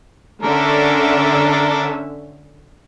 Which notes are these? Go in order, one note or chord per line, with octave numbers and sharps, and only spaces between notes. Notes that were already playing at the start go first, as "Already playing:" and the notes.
D3 C#4 D4 A4 A#4 E5